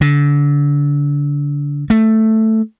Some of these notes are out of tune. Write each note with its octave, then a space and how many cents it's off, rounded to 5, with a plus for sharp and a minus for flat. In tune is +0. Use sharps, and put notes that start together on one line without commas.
D3 -25
A3 +5